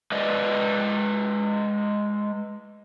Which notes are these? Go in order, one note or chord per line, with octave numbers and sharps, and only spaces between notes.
G#3 B4 D5 D#5